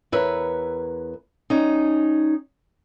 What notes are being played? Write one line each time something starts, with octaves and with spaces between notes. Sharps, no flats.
E2 A#4 B4 C#5 E5
G3 C#4 D#4